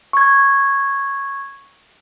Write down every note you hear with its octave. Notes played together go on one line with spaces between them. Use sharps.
C#6 G#6